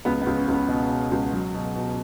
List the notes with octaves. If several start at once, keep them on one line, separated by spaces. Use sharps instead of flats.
C#2 B3
B3
C#2
C#4
C#2
B3
B2 B3
B2
C#2
F#3
B2
B2